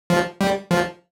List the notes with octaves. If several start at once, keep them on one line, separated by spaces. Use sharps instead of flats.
F3
G3
F3